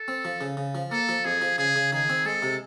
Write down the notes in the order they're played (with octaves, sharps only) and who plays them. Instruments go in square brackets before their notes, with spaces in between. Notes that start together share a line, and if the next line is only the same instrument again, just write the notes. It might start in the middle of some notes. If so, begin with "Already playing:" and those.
Already playing: [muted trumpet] A4
[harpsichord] C4
F3
C#3
C#3
F3
[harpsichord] A#3 [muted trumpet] A4
[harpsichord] F3
[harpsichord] F2 [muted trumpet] G#4
[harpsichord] F3
[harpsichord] C#3 [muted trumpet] G#4
[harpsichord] C#3
[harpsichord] D#3 [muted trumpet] G#4
[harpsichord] C4
[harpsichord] G#3 [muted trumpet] A4
[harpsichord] C3